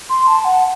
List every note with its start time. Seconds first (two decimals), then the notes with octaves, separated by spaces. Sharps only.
0.10 C6
0.27 A5
0.45 F#5